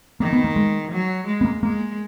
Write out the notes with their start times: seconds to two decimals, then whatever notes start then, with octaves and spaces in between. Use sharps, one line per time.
0.20 D#3 A#3
0.33 B3
0.44 A#3
0.56 G#3
0.92 F#3
1.27 G#3
1.41 B3
1.45 A#3
1.63 G#3 A#3